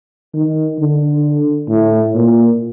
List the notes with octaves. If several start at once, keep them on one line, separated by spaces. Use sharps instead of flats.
D#3
D3
A2
A#2